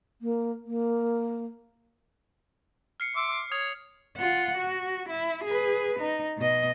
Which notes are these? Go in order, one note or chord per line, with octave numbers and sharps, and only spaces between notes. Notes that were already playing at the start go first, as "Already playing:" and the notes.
A#3
A#3
F6 C7 C#7
E5 C6 D6
C#5 D#6 G#6 F7
F4 F#5
F#4
E4
G#4 B4
D#4
B2 D#5